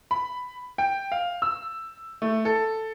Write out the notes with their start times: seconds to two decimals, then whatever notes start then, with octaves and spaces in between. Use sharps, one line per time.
0.11 B5
0.78 G5
1.12 F5
1.42 E6
2.22 A3
2.45 A4